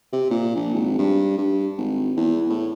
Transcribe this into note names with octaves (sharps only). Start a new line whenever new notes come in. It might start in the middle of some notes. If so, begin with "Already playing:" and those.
C3
A#2
A#1
G#1
G2
G2
G#1
E2
A2